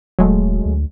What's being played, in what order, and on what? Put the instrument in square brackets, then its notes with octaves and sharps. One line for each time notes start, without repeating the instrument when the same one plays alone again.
[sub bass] D#1 [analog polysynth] F#3 G#3 A3
[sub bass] D2